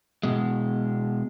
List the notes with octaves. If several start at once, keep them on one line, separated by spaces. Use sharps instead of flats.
B2 G#3